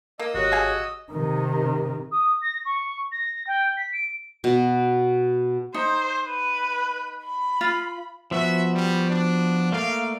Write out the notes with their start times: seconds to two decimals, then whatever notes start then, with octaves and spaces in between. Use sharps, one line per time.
0.19 A#3 D#5 D#6 E6
0.35 G#1 F#4 G4 C#5
0.52 G#4 F5 G#5
1.12 C3 D#3
2.12 D#6
2.42 A#6
2.65 C#6
3.12 A#6
3.47 G5
3.77 B6
3.93 D7
4.44 B2
5.74 D#4 C5
6.28 B4
7.24 B5
7.61 F4
8.31 F3 B3 F#4 E5
8.74 G3
9.10 D4
9.72 A3 A#3 D5 F5